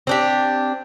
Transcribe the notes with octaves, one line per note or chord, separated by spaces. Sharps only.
C4 D4 G4